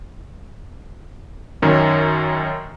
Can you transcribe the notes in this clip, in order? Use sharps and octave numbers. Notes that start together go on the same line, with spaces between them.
F#2 D#3 C#4